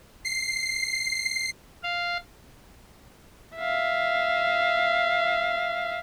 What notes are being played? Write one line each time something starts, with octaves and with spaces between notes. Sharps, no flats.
C7
F5
E5 F5